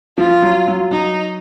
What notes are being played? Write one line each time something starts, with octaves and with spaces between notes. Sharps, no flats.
F3 F4
F#3
F#3
F#3 D#4